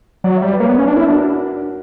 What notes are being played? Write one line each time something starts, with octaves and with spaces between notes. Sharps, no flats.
F#3 D5
E5
G3
D5
B4
A#3 C#5
B3
C#4 B4
D4
E4 A#4
D4 F#4